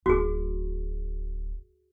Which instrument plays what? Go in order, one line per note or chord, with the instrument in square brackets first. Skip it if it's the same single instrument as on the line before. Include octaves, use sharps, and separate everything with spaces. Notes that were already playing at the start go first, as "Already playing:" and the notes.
[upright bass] D1 [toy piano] F#4 G#4